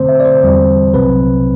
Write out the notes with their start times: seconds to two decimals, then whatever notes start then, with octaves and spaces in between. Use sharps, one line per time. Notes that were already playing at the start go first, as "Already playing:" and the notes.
Already playing: F#2 D3 A3 C4 C5
0.09 E5
0.20 D5
0.25 C5
0.43 E2 D3 G3 C4
0.94 C2 C3 F#3 C4 B4